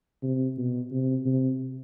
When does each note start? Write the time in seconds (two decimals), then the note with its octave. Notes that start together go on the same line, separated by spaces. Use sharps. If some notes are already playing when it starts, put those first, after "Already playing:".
0.23 C3
0.57 B2
0.92 C3
1.26 C3